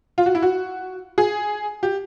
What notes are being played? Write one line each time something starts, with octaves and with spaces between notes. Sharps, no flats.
F4
F#4
E4
F#4
G#4
G4